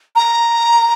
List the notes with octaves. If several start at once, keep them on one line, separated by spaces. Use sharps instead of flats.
A#5